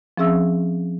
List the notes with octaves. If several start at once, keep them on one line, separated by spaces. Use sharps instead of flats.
F3 C4 C#4 G#4 E5 E6